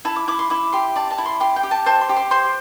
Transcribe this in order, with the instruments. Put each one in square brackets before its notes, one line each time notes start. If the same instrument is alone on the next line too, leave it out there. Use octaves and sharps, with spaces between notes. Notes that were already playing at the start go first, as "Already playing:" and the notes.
[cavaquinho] E4 A5
D6
E4 D6
C6
E4 D6
G4 C6
D5 A5
A5
E4
C6
G4 C6
G5
G4
A5
C5 A5
C6
G4
C6
C5 C6